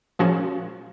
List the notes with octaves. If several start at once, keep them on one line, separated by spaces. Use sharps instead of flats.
A#2 F3 G#3 C#4 F#4